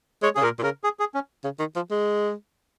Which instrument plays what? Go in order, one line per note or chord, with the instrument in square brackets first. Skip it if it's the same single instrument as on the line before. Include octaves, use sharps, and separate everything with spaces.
[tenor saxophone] G#3 [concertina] C#5
[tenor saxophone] C#3 [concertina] G#4
[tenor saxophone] A#2 [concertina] A#4
[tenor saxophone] A#2
[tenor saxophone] C#3 [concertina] A#4
[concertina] G#4
G#4
C#4
[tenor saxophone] C#3
D#3
F3
G#3